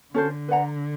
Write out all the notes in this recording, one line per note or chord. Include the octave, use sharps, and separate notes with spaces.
D3 C#4 F#4 A4 C5
B4 D5 F#5 A#5